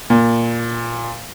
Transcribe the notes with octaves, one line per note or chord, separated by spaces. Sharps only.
A#2